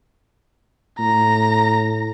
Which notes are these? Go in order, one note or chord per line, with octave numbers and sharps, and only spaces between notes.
A2 A#5